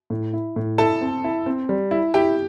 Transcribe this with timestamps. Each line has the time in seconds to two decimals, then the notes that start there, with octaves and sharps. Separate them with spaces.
0.10 A2
0.33 E4
0.56 A2
0.78 E4 A4 A5
1.01 C4
1.24 E4
1.46 C4
1.69 G3
1.91 E4
2.14 E4 G4 G5